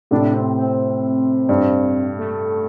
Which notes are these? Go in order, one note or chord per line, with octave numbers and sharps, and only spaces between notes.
A2 C3 D4
C4
C4
G2
A3